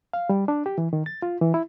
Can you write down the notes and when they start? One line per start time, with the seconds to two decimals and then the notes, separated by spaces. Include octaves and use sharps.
0.13 F5
0.29 G3
0.48 D4
0.66 G4
0.78 E3
0.93 D#3
1.06 A6
1.22 F4
1.42 E3
1.54 E4